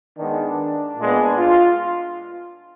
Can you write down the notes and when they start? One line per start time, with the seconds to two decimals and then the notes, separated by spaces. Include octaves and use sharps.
0.18 D#3 G#3 B3 D4
0.97 A#2 G#3 B3
1.37 F4